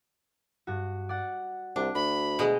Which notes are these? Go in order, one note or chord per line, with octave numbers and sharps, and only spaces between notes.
G2 F#4
D5 F#5
C2 D4
D2 B5
B2 G#3 D#5